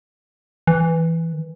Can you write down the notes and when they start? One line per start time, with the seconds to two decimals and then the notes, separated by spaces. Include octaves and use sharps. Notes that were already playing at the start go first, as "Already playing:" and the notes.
0.67 E3
1.33 D#3
1.39 E3